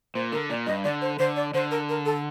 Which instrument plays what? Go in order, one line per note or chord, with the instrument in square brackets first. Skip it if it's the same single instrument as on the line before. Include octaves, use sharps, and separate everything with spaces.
[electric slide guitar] A#2 [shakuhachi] C5
[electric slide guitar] D3 [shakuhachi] A#4
[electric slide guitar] A#2 [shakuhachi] D5
[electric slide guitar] G2 [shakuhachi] D#5
[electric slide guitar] D3 [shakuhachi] D5
[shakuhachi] C5
[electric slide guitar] D3 [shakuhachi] C5
[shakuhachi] D5
[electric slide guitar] D3 [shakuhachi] C5
[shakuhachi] A#4
A#4
A4